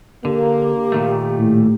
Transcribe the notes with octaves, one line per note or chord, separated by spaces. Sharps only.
D3 A#3 G4
A#2 D#3 A3
A2